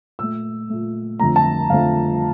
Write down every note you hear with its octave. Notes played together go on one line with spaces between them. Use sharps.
A#2 A3 E6
A#2 A3
F2 D3 F3 A3 A#5
A5
F2 D3 F3 A3 F5